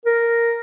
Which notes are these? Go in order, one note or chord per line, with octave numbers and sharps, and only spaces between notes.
A#4